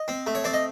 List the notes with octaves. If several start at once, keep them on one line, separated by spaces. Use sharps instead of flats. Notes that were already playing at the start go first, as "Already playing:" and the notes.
Already playing: D#5
C4
A3
C#5
C4 D5
D#5